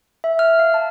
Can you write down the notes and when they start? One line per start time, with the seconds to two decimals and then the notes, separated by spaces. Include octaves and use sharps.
0.24 E5
0.39 F6
0.59 F5
0.74 A5